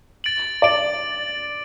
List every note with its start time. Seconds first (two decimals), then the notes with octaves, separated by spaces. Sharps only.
0.24 A6 D7 F#7
0.62 D5 A6 D7 F#7